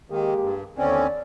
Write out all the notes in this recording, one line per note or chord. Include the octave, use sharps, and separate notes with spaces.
D#3 G#3 A#3 G4
G2
D#2 D3 C4 C#4 D5